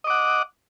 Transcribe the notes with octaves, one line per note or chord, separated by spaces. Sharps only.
D#5 F#5 D6